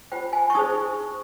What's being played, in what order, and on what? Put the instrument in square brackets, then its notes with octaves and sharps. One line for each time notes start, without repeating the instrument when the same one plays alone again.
[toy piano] F4 C5 G5
G#5
C#6
D#4 G#4 C5 D#6